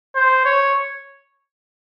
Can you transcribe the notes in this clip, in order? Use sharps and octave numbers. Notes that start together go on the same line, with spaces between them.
C5
C#5